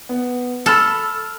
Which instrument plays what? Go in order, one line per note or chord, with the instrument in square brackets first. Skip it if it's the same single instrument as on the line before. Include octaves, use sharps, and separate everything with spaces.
[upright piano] B3
[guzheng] A4 [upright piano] B5 F6 E7